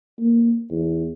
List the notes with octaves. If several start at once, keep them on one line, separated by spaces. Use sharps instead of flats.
A#3
E2